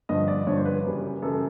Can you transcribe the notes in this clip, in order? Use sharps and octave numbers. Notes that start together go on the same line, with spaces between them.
G2 D3 F3 D#5
D5
G2 D3 F3 C#5
C5
B4
F#2 C#3 E3 G3
F#2 C#3 E3 G3 A4